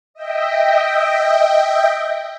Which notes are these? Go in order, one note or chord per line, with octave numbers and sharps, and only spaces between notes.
D#5 E5 G5